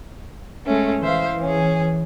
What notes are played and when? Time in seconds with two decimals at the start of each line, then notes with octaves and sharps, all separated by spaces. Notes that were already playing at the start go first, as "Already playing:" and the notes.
0.65 G#3 A3 C#4
1.02 E3 C5 E5 F5
1.40 C#4 G#4